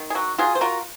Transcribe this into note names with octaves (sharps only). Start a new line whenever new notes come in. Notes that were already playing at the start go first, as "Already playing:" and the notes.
Already playing: D#3
G#4
F#3 F#4
F#3 F4 G#4
C5
F4 F#4 A#4